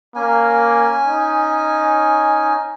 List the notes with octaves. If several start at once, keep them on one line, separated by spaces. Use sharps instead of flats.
A#3 C#4 G#5
D#4